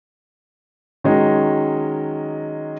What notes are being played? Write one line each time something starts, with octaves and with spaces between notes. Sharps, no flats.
D#3 F#3 G#3 C#4 D#4